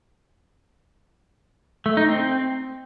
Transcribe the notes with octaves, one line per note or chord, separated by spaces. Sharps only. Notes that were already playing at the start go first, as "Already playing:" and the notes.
A3
D#4
C4